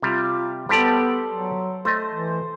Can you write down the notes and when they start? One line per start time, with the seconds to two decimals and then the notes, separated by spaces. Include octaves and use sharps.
0.02 C3 G3 F4
0.69 G3 B3 G4 A4 C5 D5
1.32 F#3
1.85 A3 C5 D#5
2.12 E3